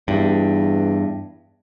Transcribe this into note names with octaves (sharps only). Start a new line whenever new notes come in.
E2 G2